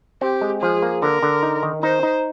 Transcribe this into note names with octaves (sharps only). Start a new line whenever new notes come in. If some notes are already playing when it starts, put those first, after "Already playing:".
C4 G4
G#3
F3 G#4
A#3
D3 A#4
D3
D#4
D#3
D#4 C5
D#4